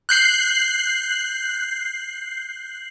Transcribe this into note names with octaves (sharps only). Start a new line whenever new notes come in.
F#6 G6 C7 F#7